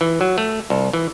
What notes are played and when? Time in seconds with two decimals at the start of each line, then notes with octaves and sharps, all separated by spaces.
0.01 E3
0.21 F#3
0.38 A3
0.70 C2
0.93 E3